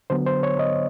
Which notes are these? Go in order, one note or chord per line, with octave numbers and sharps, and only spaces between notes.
D3 F#3 B3 C5
C5
C#5
D#5